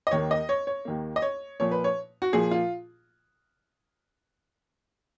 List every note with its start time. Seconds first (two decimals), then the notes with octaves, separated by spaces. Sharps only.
0.07 D#5
0.11 D#2 D#3 A#3 C#5
0.31 D#5
0.49 C#5
0.67 C#5
0.85 D#2 D#3 A#3
1.16 D#5
1.22 C#5
1.60 A#2 F3 A#3 C#5
1.71 B4
1.84 C#5
2.22 F#4
2.33 A#2 F3 A#3 G#4
2.51 F4